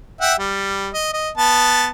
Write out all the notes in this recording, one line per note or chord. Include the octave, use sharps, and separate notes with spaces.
E5 F#5 G5
G3
D#5
D#5
B3 A5